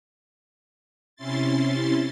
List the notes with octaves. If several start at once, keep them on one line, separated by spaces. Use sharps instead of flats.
C3 C#4 E4 C6 A6